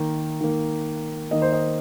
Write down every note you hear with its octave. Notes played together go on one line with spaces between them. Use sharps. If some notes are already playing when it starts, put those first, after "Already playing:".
Already playing: D#3 A#3
D#3 A#3
D#3 A#3 D#5
C5
D#5